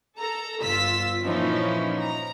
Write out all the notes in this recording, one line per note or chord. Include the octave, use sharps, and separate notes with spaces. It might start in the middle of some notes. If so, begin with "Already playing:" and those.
A4 A#5
G1 F4 E6 B6
A#2 E3 F3 C#4 D#4 E4
A#5